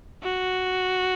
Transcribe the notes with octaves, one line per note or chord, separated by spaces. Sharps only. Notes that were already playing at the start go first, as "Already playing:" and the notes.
F#4